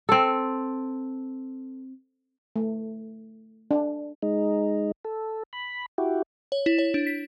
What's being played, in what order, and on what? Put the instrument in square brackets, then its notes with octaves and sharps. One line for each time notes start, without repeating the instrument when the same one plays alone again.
[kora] C4 A4
[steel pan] A3
D4
[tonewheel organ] G#3 D#4
A4
B5
E4 F#4 G4
[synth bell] C#5
E4
C#5
D4
B6